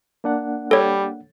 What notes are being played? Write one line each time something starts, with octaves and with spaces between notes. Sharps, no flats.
A#3 D4 F#5
G3 A4 C#5